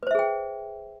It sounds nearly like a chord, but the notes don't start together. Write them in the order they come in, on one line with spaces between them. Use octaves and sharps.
B4 C5 E5 G#4 G5